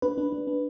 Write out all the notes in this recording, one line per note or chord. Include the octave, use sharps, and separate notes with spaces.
D4 B4
D4
D4
D4